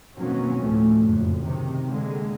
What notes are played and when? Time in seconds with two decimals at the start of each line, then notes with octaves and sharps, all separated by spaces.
0.16 B2 D#3 F#3 A#3 C4 C#4
0.59 D2 A2 F3 A3
1.00 F#1 F2
1.42 C3 D#3
1.86 D3 G#3 A#3